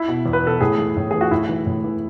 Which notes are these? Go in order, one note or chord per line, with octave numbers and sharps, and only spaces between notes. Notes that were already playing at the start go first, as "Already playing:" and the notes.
Already playing: E4
B2
E2
B4
B2 A4
A2 G#4
E3
A2
E3 G#4
F#4
A2 E4
E3
A2
E3